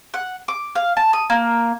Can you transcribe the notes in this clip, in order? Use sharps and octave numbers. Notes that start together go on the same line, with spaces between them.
F#5
D6
F5
A5
D#6
A#3